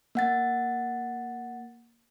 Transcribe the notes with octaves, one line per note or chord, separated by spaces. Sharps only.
A#3 F#5 A6